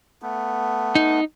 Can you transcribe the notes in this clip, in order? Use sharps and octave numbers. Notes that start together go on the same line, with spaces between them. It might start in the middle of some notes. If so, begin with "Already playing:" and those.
A3 B3
D#4